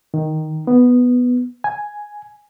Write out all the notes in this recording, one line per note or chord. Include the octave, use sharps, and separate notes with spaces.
D#3
B3
G#5